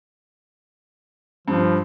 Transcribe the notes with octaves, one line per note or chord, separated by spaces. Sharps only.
G2 F3